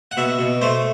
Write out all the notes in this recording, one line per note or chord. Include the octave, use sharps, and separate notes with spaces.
F#5
B2 E5
B2
A3 C5